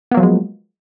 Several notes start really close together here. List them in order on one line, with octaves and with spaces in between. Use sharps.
B3 A#3 F#3 F3 G#3